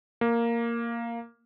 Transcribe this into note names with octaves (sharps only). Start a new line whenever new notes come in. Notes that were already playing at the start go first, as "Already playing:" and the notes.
A#3